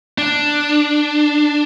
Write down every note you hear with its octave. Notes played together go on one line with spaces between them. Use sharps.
D4